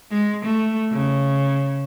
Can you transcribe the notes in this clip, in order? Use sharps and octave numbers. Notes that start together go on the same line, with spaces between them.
G#3
A3
C#3